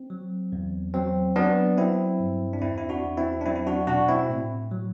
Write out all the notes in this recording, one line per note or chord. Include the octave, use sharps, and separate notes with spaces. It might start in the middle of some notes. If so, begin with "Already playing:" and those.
Already playing: C4
F#3
E2
F#3 C4
F#3 B3 D4
F#3 C4 E4
G2
D4
E2 C4 E4
E4
D4 F#4
E2
C4 E4
D4
F#3 C4 E4
E4
D4 F#4
B2 D4 F#4
C4 E4
A2
F#3